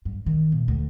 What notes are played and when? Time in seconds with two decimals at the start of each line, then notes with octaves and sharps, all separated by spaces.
0.05 G2
0.26 D#3
0.52 A#2
0.68 D2